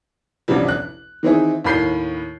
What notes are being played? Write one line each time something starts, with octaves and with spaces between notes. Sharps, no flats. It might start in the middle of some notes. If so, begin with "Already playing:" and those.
A1 D2 G2 C3 F3 G3
F#6
D#3 E3 C4 D#4 E4 G#4
D#2 A2 A#4 B5 G6 C7